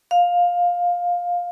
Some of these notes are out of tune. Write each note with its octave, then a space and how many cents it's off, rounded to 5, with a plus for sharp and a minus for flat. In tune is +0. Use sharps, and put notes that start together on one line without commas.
F5 +15